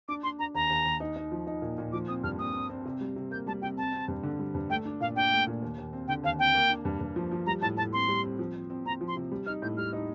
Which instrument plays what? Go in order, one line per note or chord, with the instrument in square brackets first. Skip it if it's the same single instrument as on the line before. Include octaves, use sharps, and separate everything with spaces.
[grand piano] D4 [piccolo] D6
[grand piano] D4 [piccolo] C6
[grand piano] D4 [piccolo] A#5
[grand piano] D#2 [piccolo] A#5
[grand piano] D#2
D#2
D#4
D#4
F3
D#4
A#2
A#2
[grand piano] F3 [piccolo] D6
[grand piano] C4 [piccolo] D#6
[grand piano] G2 [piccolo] F6
[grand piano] C4 [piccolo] D#6
[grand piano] C4
C4
C3
G3
C3
[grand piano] A#3 [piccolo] G6
[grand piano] G3 [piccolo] A5
[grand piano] C3 [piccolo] G5
[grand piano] C4 [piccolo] A5
[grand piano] C4
G2
D3
G3
G2
[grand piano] A3 [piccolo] G5
[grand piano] D4
[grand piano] A#2 [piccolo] F5
[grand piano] D4 [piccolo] G5
[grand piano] A3
A#2
D#2
D#2
C4
[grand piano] D3 [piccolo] G5
[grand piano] D#2 [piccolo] F5
[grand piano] C4 [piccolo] G5
[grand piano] A#3
D4
G2
G2
F3
F3
[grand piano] G3 [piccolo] A#5
[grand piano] A2 [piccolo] A5
[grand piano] A2 [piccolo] A5
[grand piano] C4 [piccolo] C6
[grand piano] G3
C4
F3
C4
C4
[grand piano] C4 [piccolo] A#5
[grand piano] F3
[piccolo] C6
[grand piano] C3
G3
[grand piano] D#4 [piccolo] F6
[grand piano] A2 [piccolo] G6
[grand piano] G3 [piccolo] F6
[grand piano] D#4